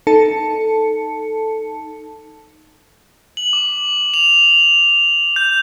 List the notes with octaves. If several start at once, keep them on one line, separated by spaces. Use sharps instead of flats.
D#4 A4 A5 C#7
F#7
D6
F7
G6